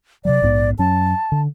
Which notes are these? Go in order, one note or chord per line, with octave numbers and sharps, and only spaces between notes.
C3 D#3 F#3 D5
A#1 G#2 B3
F#2 F#3 C#4 A5
D3